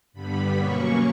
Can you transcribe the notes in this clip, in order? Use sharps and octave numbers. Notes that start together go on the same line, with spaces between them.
G2 D3 G3 B3 B5
B2 F#3 A#3 C#4 C#6